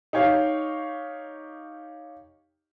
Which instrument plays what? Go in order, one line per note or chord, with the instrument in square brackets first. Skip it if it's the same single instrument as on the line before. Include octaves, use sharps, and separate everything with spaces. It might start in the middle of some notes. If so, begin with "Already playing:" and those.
[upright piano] D#4 G4 C#5 F5